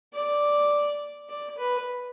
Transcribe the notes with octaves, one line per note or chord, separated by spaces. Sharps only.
D5
D5
B4